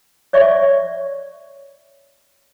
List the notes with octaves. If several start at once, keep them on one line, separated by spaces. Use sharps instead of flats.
C#5 D5 E5 C#6